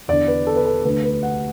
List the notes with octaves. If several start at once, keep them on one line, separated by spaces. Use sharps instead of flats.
E2 D3 D5
B4
A4
B4
A4
D2 D3 B4
B4
F#5